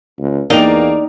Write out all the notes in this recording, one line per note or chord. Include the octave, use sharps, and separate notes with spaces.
C#2
E2 A#3 D4 D#4 G4 F7